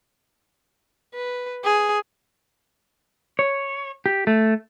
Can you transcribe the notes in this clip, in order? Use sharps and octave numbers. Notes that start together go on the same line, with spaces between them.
B4
G#4
C#5
G4
A3